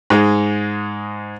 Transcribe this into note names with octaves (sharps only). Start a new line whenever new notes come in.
G#2 G#3